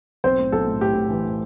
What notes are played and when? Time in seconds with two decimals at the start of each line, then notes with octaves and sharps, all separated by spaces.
0.24 B1 C4 C5
0.38 A2
0.52 B1 A4
0.66 A2
0.81 A2 G4
0.95 A2
1.10 E3
1.25 A2